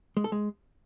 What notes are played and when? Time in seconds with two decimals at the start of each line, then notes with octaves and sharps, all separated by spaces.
0.17 G#3
0.24 A4
0.32 G#3